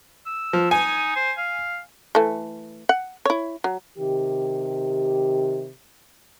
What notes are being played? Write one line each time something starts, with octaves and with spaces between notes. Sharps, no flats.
E6
F3
D#4 G#5
C5
F5
E3 A3
F#5
E4 C#5
F#3
C3 D#3 G4